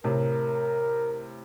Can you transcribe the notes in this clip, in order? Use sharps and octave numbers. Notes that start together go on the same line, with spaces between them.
A2 C3 A#4